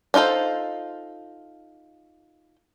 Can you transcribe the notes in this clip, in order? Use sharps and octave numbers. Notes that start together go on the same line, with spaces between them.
D4 D#4 F4 A4 C5